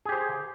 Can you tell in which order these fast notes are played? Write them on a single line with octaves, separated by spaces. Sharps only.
G#4 G4 C5